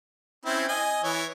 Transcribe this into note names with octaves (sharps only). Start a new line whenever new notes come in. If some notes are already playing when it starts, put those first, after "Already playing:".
C4 C#4 E4
D#5 G#5
E3 C#5